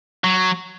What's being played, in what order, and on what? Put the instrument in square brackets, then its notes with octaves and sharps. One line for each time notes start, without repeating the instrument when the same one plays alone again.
[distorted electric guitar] F#3